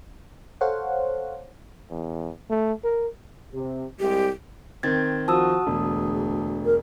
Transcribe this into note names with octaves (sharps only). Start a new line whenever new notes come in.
A4 C5 C#5 F5 F#5
E2
A3
A#4
C3
C2 G#3 G4
D#3 C4 G#6 A6
F3 F#4 A5 D#6 E6
E1 D2 G#4
A#4